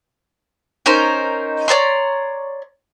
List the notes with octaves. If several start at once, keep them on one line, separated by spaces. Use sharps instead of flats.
C#4 D#4 A#4 C5
C#5 D5 A#5 C6